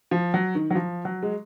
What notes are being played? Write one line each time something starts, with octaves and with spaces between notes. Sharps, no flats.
F3
F#3
D#3
F#3
F3
F#3
G#3